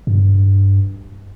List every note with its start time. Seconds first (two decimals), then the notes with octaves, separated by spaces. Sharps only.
0.07 G2